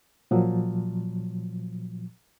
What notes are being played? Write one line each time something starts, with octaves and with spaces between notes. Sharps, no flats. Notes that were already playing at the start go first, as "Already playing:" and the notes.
A#2 F3 F#3